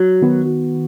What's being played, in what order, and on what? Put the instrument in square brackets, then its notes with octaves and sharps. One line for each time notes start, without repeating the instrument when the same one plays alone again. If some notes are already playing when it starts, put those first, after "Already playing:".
Already playing: [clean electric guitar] F#3
[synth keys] D#3 B3 F#4